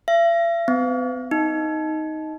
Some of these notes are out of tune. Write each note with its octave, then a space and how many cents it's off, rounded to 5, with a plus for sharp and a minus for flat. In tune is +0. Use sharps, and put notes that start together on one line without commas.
E5 +45
B3 +40
D#4 +10